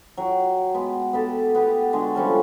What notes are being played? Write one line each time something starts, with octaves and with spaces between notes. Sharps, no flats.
F#3 G5
G#3 B3
B3 G4 A4
B3 G4
D3 G#3 F#4
F3 G3 C#4 A4